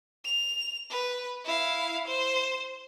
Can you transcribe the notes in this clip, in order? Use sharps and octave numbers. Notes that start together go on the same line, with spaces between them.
F7
B4
E4 F5
C5